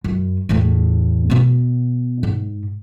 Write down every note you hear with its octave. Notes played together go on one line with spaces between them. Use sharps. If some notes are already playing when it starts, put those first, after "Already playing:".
F#2
E2 A2
B2 B3
G#2